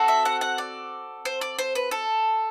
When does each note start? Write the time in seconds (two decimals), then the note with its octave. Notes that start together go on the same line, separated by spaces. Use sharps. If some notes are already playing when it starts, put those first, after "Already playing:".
Already playing: C4 F#4 A4
0.08 E5
0.25 F#5
0.41 F#5
0.58 D5
1.25 C5
1.41 D5
1.59 C5
1.75 B4
1.91 A4